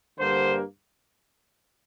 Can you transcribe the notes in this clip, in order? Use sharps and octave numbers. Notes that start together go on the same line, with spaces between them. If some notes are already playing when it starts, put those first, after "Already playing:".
G2 D3 G3 A#3 C5